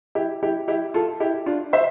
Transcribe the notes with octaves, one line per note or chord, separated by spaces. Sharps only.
E4 G4
E4 G4
E4 G4
F4 A4
E4 G4
D4 F4
C5 E5